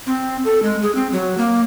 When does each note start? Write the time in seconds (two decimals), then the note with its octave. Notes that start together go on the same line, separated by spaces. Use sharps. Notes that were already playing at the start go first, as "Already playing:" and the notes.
0.06 C4
0.45 A4
0.63 G#3
0.82 G#4
0.95 C4
1.12 F#3
1.38 A#3